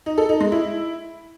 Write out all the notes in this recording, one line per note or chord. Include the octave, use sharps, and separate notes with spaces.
D#4
A4
D#4
G#3
E4